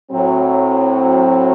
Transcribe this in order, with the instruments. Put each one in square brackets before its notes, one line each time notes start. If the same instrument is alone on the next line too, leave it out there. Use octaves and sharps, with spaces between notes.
[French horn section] A2 F#3 C4